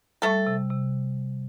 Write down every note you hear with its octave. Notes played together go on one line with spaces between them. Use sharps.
G3 A3 A4
C3
C3